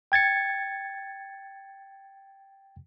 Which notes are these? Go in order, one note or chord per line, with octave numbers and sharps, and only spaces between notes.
G5 G#6 A6 C#7